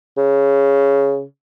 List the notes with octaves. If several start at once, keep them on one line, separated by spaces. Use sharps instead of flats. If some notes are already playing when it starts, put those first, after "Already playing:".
C#3